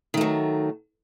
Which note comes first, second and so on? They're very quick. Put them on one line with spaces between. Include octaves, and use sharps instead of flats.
D#3 A3 F#3